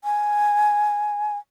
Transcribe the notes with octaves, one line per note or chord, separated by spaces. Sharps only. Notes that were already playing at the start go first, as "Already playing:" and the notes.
G#5